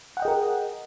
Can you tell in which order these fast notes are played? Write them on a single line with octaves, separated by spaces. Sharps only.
F#5 G5 D#5 G#4 A#4